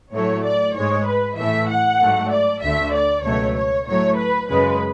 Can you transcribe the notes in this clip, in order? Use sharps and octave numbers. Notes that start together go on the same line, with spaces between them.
A2 F#3 A3 C#5
D5
G#2 G#3 C#5
B4
A2 E3 A3 E5
F#5
G#2 F#3 A3
D5
D2 D3 A3 E5
D5
C#2 B2 F#3 A3 C#5
C#5
A2 F#3 A3 C#5
B4
F#2 C#3 G#3 B4